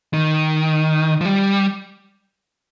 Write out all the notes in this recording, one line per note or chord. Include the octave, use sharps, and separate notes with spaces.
D#3
F3
G3